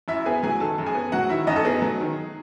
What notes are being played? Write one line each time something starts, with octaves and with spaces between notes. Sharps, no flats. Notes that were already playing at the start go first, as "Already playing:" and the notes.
F#2 E4 E5
B3 G#4 G#5
F#3 G#4 G#5
D#3 A4 A5
F#2
G#4 G#5
B3
F#3 F#4 F#5
D#3 E4 E5
F#2 D#4 D#5
A4
B3 G#4
F#3
D#3